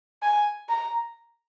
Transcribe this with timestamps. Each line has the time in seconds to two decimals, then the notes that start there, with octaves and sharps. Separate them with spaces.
0.23 G#5
0.69 A#5